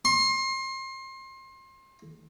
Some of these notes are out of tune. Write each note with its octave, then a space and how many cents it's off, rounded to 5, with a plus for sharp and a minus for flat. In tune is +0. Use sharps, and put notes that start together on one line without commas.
C6 +30